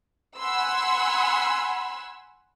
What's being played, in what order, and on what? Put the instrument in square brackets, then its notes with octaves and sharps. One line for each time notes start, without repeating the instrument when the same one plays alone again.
[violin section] F#5 G#5 B5 C6 E6